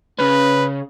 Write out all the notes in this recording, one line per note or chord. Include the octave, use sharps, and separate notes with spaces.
C#3 C#4 B4